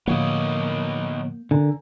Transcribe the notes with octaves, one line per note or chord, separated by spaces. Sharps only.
A2 D3 F3 A#3 B3 C#5 D#5
D3 A#4 G#5 A#5